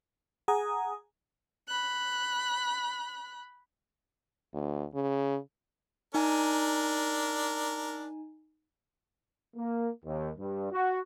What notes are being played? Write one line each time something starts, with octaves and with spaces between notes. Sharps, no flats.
G#4 F#5 G#5 A#5 D#6
B5 F#6
D2
C#3
D4 D#4 A#4 G#5
A#3
D#2
G2
F#4